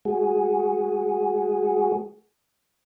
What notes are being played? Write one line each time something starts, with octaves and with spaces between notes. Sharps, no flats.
G#3 F#4 G#4